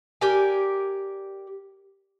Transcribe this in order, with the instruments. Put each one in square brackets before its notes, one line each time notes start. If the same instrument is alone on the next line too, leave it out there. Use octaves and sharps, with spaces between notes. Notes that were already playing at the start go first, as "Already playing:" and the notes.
[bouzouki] G4 A#4 D5 G#5